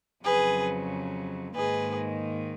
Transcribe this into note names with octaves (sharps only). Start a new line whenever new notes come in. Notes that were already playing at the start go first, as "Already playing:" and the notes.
F2 C#3 F#3 G#4 B4
G#2 D#3 A#3 G#4 B4